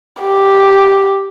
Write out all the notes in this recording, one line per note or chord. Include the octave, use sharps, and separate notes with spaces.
G4